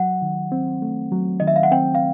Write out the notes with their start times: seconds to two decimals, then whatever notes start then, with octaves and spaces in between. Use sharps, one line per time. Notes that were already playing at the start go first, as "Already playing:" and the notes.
Already playing: F#3 F#5
0.22 D#3
0.52 C4
0.82 A3
1.12 F#3
1.40 D#3 D#5
1.47 E5
1.56 F5
1.63 F#5
1.72 C4 G5
1.95 F5